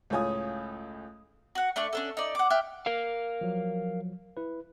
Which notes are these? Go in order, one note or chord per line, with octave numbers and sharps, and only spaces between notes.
C#2 A2 F4 C#5 G#5 D#6
F#4 F#5
A3 D4 D5 C#6
C#4 D4 A4
D#4 D5
F#5 D6
E5 G5 F6 F#6
A#4 F5
F3 F#3
E4 B4